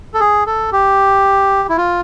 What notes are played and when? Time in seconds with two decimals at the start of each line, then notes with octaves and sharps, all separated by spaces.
0.14 A4
0.20 G#4
0.46 A4
0.72 G4
1.69 E4
1.77 F4